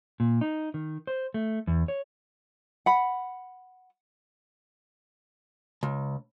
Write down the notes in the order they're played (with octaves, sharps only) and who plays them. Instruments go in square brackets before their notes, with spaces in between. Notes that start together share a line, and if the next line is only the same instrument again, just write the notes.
[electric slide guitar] A#2
D#4
D#3
C5
A3
E2
C#5
[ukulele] F#5 B5
[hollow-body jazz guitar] C#2